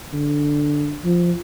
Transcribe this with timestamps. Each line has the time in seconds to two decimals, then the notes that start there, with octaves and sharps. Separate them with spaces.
0.14 D3
1.05 F3